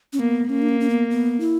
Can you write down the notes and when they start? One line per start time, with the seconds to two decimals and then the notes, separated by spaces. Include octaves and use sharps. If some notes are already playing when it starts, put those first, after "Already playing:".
0.13 C#4
0.19 A#3 B3
0.50 A#3 C#4
0.62 D4
0.69 C#4
0.80 C#4
0.90 B3
1.10 B3
1.40 E4